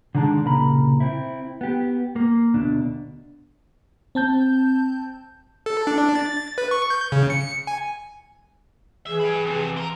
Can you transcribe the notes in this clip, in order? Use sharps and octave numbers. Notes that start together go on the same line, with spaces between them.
D3 D#3 G#3 D4 A5
C2 A#2 C#3 A#4 A#5 B5
C4 E4
B3 G4
A#3
D2 B2 D4
C4 A5 G6
A4
D4
A6
B4
C#6
G6
C#3
C#7
G#5
E3 G#4 E5
G4 B4
F2 C3
A#4 C5